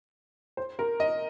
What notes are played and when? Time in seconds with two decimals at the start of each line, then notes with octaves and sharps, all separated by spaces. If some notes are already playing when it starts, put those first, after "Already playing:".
0.57 C5
0.79 A#4
1.00 D#5